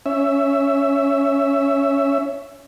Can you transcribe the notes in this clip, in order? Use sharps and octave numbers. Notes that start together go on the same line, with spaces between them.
C#4 E5